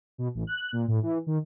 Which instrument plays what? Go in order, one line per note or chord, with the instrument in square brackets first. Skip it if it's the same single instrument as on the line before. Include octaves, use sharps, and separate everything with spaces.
[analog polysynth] B2
A1
F#6
A#2
A2
E3
D#3